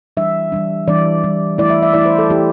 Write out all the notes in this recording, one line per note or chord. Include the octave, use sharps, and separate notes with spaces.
E3 G3 D4 E5
E3 G3 D4
E3 G3 D4 D5
E3 G3 D4
E3 A3 E4 D5
E5
E5
E3 A3 E4 D5
C5
A4
E3 A3 E4 G4